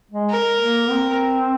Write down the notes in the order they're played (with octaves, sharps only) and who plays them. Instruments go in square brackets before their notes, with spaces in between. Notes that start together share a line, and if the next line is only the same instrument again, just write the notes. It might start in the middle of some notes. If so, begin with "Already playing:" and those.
[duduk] G#3
[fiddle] A#4
[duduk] A#3
C4